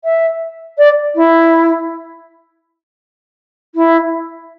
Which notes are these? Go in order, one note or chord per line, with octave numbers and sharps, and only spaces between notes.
E5
D5
E4
E4